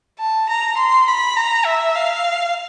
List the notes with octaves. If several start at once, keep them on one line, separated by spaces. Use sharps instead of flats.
A5
A#5
C6
B5
A#5
E5
F5